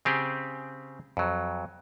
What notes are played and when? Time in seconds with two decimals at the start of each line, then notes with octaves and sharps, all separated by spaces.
0.05 C#3 C4 G4 G#4
1.17 F2 F#3